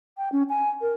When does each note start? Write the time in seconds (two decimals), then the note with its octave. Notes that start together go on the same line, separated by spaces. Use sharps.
0.18 G5
0.32 C#4
0.49 G#5
0.81 A#4